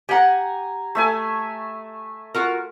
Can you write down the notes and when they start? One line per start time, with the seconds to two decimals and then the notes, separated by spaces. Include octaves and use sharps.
0.09 G4 F#5 G#5 A#5
0.95 A3 E5 G#5
2.35 F4 F#4 A#4